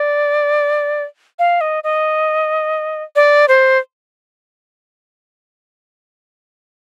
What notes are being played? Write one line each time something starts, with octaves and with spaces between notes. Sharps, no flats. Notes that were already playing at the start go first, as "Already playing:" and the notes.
Already playing: D5
F5
D#5
D#5
D5
C5